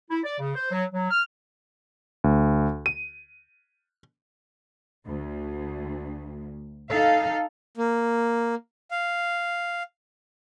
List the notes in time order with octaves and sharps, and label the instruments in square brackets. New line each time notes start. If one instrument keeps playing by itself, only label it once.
[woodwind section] E4
D5
C#3
C5
F#3
F#3
F6
[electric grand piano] D2
D#7
[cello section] D2
D#4 A4 F5
[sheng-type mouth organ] A#3
F5